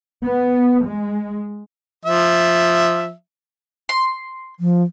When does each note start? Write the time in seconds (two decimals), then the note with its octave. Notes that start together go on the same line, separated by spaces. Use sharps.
0.25 B3
0.84 G#3
2.06 F3 E5
3.89 C6
4.60 F3